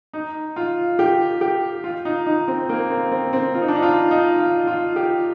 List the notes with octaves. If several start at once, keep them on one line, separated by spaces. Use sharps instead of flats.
D#4
F4
G4
G4
F4
D#4
D#4
C4
A#3
C4
C4
C4
F4
D#4
D4
D#4
F4
D#4
F4
F4
G4